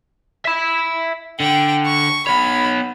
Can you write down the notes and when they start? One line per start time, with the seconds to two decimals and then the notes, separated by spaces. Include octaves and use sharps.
0.45 E5 B5
1.40 D3 G5
1.86 C#6
2.27 B3 C#5 B5